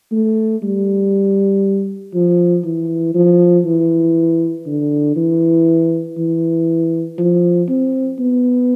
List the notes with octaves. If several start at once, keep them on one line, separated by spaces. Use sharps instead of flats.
A3
G3
F3
E3
F3
E3
D3
E3
E3
F3
C4
B3